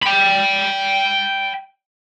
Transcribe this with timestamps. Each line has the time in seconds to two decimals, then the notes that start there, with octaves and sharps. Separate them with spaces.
0.03 G5 B5